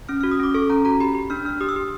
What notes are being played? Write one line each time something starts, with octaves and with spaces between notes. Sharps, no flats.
C#4 F6
F#4 F6
D#6
C#4 D6
A4 C#6
C#4 A#5
F#4 A#5
G4 B5
G4
D4 F6
D4 F6
G4 D#6
E6
G4